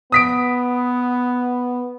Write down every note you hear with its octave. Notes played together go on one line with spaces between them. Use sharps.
B3 D#6 B6 D7